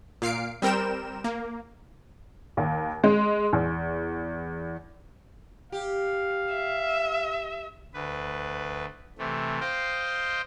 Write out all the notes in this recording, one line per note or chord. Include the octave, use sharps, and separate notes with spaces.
A#2 F5 C7 D7
G3 C4 A#4 G5 E7
A#3
D#2
G#3
E2
G4 F5
E5
D2 B4
C3 E3 A3
C5 D#5 F5 G5